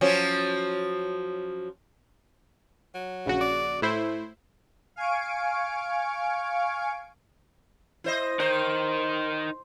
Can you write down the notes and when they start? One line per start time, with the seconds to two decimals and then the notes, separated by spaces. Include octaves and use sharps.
0.01 F3 F#3 C#4
2.94 F#3
3.26 A#1 C#3 F#4
3.41 D5
3.82 A2 A3 E4 C5
4.96 F5 G#5 C#6 D7
8.04 E4 C5 D#5
8.40 D#4 A#4 C5